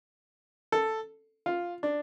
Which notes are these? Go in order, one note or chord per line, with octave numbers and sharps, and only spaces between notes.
A4
F4
D4